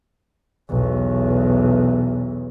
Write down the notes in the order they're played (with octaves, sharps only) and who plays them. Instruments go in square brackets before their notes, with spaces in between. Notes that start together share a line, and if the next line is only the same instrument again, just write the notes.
[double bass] B1 E2